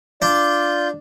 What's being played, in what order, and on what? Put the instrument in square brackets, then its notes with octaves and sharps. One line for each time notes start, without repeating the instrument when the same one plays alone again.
[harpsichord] D4 [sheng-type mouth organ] F4 G6 [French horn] D5